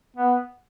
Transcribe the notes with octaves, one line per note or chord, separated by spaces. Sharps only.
B3